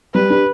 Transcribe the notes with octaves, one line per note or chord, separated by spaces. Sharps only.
G3 B4
D4 G4